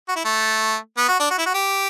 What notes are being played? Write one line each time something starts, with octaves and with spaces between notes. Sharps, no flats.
F#4
E4
A3
B3
F#4
D4
F#4
E4
F#4
G4